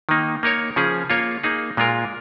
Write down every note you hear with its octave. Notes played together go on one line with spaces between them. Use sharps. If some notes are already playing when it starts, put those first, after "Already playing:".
D#3 A#3 D#4
A#3 D#4 A#4 C#5
C#3 F3 C#4 G#4
A#3 F4 C#5
A#3 D#4 G#4
A#2 G#3 F4 A#4